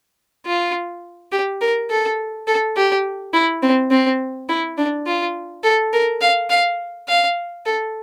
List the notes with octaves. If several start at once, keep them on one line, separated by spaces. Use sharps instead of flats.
F4
G4
A#4
A4
A4
G4
E4
C4
C4
E4
D4
F4
A4
A#4
F5
F5
F5
A4